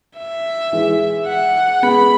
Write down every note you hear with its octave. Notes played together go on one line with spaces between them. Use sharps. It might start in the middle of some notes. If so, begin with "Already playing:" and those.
E5
E3 G#3
F#5
G#3 B3 B5